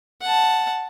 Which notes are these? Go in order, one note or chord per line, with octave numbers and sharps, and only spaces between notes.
F#5 A5